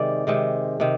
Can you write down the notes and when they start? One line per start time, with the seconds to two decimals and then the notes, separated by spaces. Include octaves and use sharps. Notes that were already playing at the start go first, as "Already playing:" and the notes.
Already playing: C3 D#3 G#3 D5
0.27 C3 D#3 G#3
0.80 C3 D#3